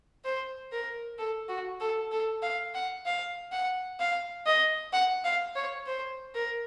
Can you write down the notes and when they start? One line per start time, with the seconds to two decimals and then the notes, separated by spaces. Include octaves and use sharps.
0.25 C5
0.72 A#4
1.19 A4
1.49 F#4
1.80 A4
2.12 A4
2.43 F5
2.74 F#5
3.06 F5
3.52 F#5
4.00 F5
4.46 D#5
4.93 F#5
5.24 F5
5.56 C#5
5.86 C5
6.35 A#4